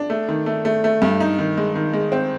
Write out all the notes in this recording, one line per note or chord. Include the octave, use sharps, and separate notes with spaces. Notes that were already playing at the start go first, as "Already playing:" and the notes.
Already playing: D4
A3
D#3
A3
A3
A3
G2
D#4
D#3
G#3
D#3
G#3
C4